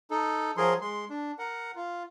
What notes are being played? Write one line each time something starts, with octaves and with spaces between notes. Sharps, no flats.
D#4 A4
F3 F#3 G#4 A#4 C6
G#3 C6
D4
A#4 F#5
F4